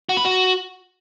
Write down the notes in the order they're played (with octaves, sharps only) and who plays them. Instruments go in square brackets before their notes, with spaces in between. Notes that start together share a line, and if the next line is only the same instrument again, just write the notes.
[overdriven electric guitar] F#4
B4
F#4